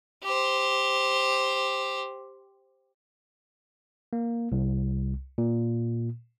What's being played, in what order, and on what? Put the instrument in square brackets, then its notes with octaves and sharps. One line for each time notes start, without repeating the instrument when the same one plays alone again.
[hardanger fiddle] G4 C5
[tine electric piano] A#3
C2
A#2